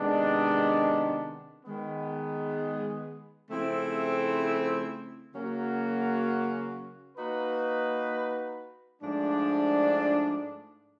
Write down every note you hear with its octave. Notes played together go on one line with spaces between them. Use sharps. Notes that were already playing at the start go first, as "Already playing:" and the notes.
Already playing: C3 D#3 G#3 B3 D4
D#3 G#3 B3
C#3 F3 A3 C4 E4
C#3 F#3 A#3 C#4 F#4
A#3 D#4 F#4 B4
G#2 F3 A3 D4